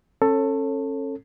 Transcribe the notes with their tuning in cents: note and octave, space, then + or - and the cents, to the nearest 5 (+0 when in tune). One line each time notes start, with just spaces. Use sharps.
C#4 -35 A4 +15 C#5 -25